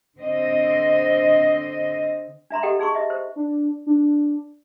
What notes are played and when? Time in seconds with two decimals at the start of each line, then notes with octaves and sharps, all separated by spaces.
0.19 D3 C4 D#5
2.50 D4 E5 A#5 C6
2.63 G4 A4 D#5 F#5 G5
2.79 D#4 G#4 C6 C#6
2.95 D#5 E5
3.10 C5
3.36 D4
3.87 D4